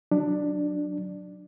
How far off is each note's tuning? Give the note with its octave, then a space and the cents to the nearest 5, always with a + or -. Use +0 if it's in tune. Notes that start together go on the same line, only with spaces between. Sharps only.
F#3 +0 D4 +10